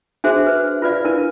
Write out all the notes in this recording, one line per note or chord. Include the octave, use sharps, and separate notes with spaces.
D4 F#4 G#4 C5 E5
B4
F4 B4 D5 F5
D4 E4 A#4 B4